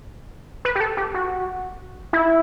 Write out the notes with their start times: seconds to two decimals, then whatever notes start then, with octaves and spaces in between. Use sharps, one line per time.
0.65 B4
0.75 G4
0.80 A4
0.97 G4
1.14 F#4
2.13 E4